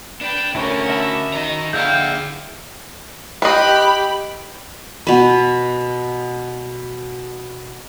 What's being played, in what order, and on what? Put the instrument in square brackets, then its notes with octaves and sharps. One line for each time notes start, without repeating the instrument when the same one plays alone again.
[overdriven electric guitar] D4 [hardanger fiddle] B4 G5
[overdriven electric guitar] D2 D3 [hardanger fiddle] C#4 A#4 [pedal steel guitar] E4 A4 C#6
[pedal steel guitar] F#4 D#5 A5 [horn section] E5 B5
[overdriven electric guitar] D#3 A#5 [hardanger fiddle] D#4
[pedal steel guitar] D3 G6 [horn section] E4 [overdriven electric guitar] G#4 D5 [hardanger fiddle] F5 G5
[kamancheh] G4 B5 [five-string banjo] B4 D#5
[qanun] B2 B4